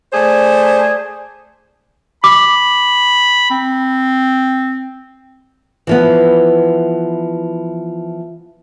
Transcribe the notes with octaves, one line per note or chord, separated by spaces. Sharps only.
A3 G#4 C5 D5
B5 D6
C4
E3 F3 B3